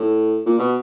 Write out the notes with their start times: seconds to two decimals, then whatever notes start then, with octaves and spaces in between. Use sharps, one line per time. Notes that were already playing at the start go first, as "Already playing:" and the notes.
Already playing: A2
0.46 A#2
0.59 B2